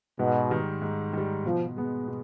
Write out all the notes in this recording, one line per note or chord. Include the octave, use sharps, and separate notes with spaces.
G#2 B2
D#3 G3
G#2
D#3 G3
B2 F3
G#3 B3
B2